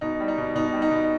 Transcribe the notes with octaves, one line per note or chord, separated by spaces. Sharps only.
B2 D#4
G3
D#4
B2
B2 D#4
G3
D#4
B2